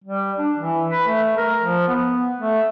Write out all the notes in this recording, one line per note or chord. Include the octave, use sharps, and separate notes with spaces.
G3
D4
E3
B4
A3
A#4
F3
B3
A3